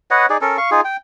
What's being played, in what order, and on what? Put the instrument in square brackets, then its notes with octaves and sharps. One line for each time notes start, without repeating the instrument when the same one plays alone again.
[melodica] B4 C#5 D#5 F#5
D#4 G#4 D5
C#4 A4 A#4
F5 C#6
D#4 F4 G#4
G5